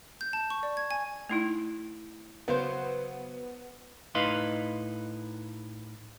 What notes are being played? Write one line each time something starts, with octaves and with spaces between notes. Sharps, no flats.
G6
A5
C#6
D5
G#6
G#5
A3 D#4 E4
C#3 F#3 B3 C5
A2 D#4 B4 D#5 F5 C6